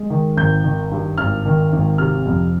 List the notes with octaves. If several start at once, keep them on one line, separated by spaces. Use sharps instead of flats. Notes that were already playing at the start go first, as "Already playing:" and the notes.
Already playing: G#3
D#3
G#1 G6
D#3
G2
G#1 F6
D#3
G#1
C3 F6
F2